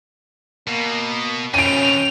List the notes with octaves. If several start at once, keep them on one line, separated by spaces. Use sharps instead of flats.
B2 A#3
F2 B2 C#4 G5 D7 D#7 F7